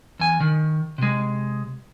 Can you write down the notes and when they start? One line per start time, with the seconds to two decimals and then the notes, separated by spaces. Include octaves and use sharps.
0.20 E2 G#5
0.40 D#3
0.98 C3 G#3